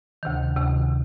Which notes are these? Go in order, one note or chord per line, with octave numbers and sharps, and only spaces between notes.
D2 C3 D#3
D2 C3 D#3